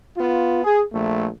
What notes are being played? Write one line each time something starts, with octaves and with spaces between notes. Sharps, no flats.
B3 F4
G#4
A#1 A3